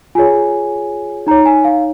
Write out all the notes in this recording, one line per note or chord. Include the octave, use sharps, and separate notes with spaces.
F4 G#4 C#5 G#5
D#4 C#5 A#5
G#5
F5